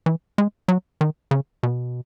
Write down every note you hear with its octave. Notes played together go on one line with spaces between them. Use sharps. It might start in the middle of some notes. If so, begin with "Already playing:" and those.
E3
G#3
F#3
D#3
C#3
B2